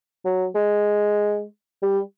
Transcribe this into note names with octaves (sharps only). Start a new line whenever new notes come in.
F#3
G#3
G3